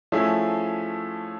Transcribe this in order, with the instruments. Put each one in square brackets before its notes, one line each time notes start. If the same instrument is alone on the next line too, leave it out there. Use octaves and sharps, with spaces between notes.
[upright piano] F3 A3 C#4 E4 G#4